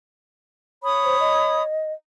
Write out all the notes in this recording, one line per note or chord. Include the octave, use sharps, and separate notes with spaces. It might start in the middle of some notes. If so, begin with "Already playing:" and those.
C#5 B5 D#6
C5
D#5